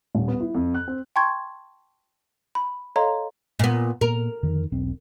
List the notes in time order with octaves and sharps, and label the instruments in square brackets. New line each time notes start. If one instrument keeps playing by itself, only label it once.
[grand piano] D#1
B3
E4
F2
F#6
C4
[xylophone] G5 A5 C6 C#6 G#6
B5
A4 C#5 D#5 F5 A#5 C6
[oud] A#2 B3
[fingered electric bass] A#2 B3 [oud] A#4
[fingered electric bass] F2 D3 D#3
E1 B1 C4